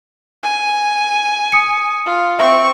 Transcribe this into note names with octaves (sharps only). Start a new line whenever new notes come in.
G#5
D#6 C#7
F4
C4 E5 C#6